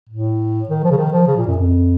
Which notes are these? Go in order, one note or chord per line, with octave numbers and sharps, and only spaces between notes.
A2
D#3
F3
C#3
D#3
F3
C#3
A#2
F#2
F2